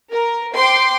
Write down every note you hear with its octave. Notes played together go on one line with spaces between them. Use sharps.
A#4
C5 G5 C6 D6 C7